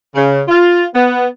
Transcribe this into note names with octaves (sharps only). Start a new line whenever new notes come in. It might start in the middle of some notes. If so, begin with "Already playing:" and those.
C#3
F4
B3